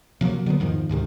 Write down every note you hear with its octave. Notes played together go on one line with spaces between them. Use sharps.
C3 F3 F#3 A#3
D3 F#3 G3 B3
E2 G#2 D#3 F3
D2 G#2 C3 D#3